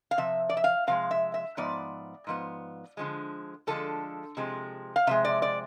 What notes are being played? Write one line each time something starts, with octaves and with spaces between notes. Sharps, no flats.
F5
C3 F3 E5
D5
E5
F5
C3 F3 G#3 F5
E5
E5
G#2 F3 B3 D5
G#2 F3 B3
D3 F3 G#3
D3 F3 G#3 A4
C3 F3 G#3
F5
C3 F3 G#3 E5
D5
D5